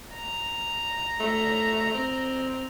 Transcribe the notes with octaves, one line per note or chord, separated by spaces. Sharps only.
A#5
A3
C4